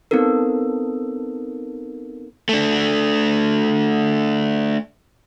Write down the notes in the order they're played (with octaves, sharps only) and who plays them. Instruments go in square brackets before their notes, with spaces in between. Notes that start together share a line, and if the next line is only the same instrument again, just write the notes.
[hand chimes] B3 C4 D#4 A4 A#4
[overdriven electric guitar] A3 D4